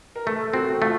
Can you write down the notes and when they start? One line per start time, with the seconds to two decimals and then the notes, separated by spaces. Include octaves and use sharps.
0.16 A#4
0.26 A3 A4
0.54 C4 F#4
0.82 A3 F4